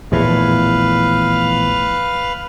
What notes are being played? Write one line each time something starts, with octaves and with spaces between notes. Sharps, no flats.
A#1 E2 A2 B4 F5